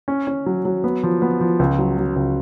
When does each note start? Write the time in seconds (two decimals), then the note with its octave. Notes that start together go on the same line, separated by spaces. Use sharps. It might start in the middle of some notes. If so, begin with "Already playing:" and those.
0.08 C#4
0.27 C#4
0.46 F#3
0.65 F#3
0.84 B3
1.03 F3
1.22 B3
1.41 F3
1.59 C#2
1.79 F#3
1.98 F#3
2.16 C#2